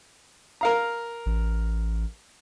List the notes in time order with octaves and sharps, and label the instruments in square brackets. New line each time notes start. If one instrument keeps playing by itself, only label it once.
[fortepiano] A#4 F5 A#5
[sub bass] A1